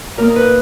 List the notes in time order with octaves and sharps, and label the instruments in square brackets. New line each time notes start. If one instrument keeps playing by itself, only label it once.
[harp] A#2 A#3 D#4 A#4
B4